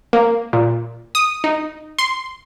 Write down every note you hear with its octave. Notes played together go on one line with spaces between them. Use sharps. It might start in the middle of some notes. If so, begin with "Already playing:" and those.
A#3
A#2
D#6
D#4
C6